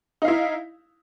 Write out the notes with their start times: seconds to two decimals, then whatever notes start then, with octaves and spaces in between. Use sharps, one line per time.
0.22 D#4
0.25 F5
0.28 E4